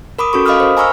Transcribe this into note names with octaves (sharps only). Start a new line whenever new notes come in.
A#4 B5 D6 D#6
C#4 F#4 A4 C#6
D#5 F5 B5 D6 D#6 F6
A#4 C5
G#5 A#5 B5 C#6 E6 F6